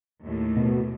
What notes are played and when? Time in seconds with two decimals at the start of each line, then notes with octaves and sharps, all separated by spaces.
0.24 D#2 A2
0.56 B2